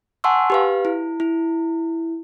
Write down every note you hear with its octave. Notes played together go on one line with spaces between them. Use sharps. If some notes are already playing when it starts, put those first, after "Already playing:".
F#5 G#5 A5 C6 C#6 E6
G4 B4 F5
E4
E4